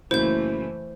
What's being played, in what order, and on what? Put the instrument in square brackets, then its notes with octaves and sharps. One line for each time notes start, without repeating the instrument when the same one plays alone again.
[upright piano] F#2 C#3 A#3 [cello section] E3 A3 [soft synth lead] E4 [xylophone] C5 G6